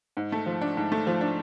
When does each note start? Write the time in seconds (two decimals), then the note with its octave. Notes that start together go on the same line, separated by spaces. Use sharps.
0.17 G#2
0.32 A3
0.46 F3
0.61 D4
0.77 G#2
0.92 A3
1.07 F3
1.21 D4